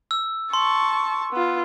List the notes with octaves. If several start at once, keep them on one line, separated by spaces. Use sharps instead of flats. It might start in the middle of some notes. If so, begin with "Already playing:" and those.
E6
A5 C6 C#6
B3 F4